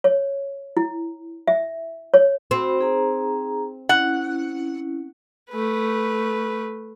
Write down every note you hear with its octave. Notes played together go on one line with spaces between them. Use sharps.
C#5
E4
E5
C#5
C4 F#4 B5
D#4 G#4 A#5
C#4 E4 F#5
A3 B4